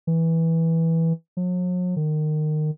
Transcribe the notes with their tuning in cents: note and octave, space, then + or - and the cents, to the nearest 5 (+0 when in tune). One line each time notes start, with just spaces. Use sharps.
E3 -10
F#3 -45
D#3 -25